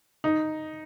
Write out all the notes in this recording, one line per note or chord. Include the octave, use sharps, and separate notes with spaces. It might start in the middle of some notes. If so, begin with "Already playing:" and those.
D#4